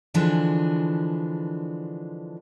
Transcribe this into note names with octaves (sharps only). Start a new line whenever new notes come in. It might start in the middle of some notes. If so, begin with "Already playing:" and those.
D3 E3 F3 G#3 D4